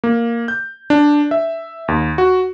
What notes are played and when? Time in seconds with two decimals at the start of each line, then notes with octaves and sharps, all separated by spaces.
0.04 A#3
0.48 G6
0.90 D4
1.31 E5
1.88 D#2
2.18 F#4